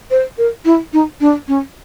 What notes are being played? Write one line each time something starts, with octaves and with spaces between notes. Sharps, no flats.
C5
A#4
E4
D#4
D4
C#4